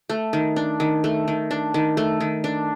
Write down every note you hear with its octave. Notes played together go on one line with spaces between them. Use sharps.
A3
D#3
D4
D#3
A3
D#3
D4
D#3
A3
D#3
D4